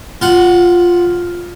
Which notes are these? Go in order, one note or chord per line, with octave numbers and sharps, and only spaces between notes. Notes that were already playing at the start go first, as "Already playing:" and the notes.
F4 F#5